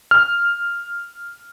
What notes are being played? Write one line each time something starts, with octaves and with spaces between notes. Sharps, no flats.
F6